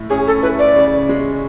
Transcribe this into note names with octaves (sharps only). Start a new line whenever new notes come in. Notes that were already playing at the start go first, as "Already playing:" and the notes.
Already playing: A2 E4
C#4 G#4
A4
E4 B4
D5
C#3
G#3